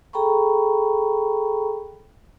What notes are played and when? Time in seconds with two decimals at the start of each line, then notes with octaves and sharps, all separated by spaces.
0.13 G#4 A4 G5 A#5 B5 C#6